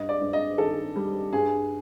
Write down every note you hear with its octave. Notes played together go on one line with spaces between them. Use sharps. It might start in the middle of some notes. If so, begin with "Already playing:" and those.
Already playing: G2 D#5
D5
G2
D#5
D#3 A4
G3
G2 G#4